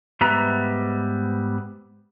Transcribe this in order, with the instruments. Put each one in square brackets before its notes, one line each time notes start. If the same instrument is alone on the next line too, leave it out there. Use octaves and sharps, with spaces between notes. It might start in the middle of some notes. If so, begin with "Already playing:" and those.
[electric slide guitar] G#2 G3 B3 B4 E5 A#5